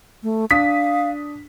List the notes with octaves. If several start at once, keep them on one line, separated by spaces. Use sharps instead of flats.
A3
D4 F5 D#6 B6